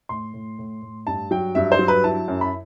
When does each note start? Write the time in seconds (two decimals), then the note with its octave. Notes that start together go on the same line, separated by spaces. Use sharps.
0.09 A2 C6
0.34 A2
0.59 A2
0.82 A2
1.07 G2 A5
1.31 F#3 G5
1.55 G2 E5
1.72 C5
1.79 F#3
1.88 B4
2.04 E4 A5
2.28 F#2
2.41 B5